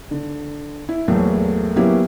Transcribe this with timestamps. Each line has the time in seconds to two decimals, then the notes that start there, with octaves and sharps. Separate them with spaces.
0.11 D3
0.89 E4
1.08 E2 A2 F#3 A3 A#3
1.76 F#3 A#3 B3 C#4 E4 G4